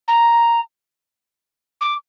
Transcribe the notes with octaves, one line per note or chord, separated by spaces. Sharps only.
A#5
D6